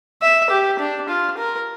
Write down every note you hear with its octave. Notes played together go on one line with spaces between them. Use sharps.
E5
G4
D4
F4
A#4